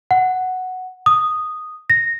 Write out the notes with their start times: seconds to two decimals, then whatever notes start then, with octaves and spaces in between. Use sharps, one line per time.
0.11 F#5
1.06 D#6
1.90 A#6